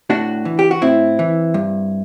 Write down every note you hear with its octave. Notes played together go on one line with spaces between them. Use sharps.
A2 D4 F#4
E3
G4
F#4
A2 C4 E4
E3
G2